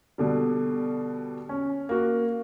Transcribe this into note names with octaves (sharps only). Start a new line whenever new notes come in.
B2 D3 G3
C#4
A#3 F#4